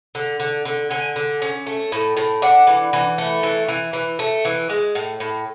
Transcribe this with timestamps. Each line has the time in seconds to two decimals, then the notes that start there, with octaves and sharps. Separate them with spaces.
0.15 D3
0.40 D3
0.65 D3
0.91 D3 G#5
1.16 D3
1.42 C#4
1.67 A3
1.92 A2
2.17 A2
2.42 D4 F#5
2.67 E3
2.93 E3
3.18 A3
3.43 E3
3.69 E3
3.93 E3
4.19 A3
4.45 E3
4.70 G#3
4.95 A2
5.20 A2